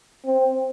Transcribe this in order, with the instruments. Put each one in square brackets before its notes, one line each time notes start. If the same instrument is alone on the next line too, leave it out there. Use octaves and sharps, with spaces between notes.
[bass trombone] C4